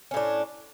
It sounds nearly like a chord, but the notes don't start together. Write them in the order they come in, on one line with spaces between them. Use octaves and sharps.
C#4 A2 D4